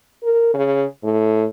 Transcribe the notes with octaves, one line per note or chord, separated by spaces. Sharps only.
A#4
C#3
A2